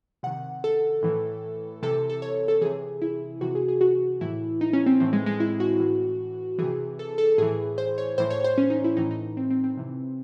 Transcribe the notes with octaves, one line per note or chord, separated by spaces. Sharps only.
C3 D#3 F#5
A4
A2 E3
C3 E3 A4
A4
C#5
A4
C3 E3 G#4
E4
C3 E3 F#4
G#4
G#4
F#4
A2 E3 E4
D#4
C#4
C4
A2 E3 C4
G#3
G#3
E4
F#4
A2 E3
C3 E3 G#4
A4
A4
A2 E3 G#4
C5
C#5
A2 E3 C5
C#5
C5
C#4
D#4
E4
A2 E3 D#4
D#4
C4
C4
C4
C3 E3